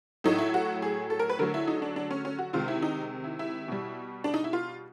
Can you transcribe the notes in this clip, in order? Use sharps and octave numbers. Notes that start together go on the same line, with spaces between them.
A2 F#3 A3 D#4
E4
F#4
G#4
A4
A#4
B4
D3 F#3 A3 A#4
E4
D#4
D4
D4
C#4
C#4
F#4
C3 D#3 G#3 F4
E4
D#4
E4
E4
B2 G3
D4
D#4
E4
F4